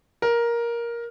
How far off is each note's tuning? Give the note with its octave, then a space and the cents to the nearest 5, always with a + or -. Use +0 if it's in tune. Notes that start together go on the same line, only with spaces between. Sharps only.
A#4 +10